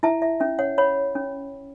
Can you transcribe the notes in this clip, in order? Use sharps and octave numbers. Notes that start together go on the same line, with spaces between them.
E4 E5 A5
E5
C#4 E5
C#5 F#5
C#5 F#5 B5
C#4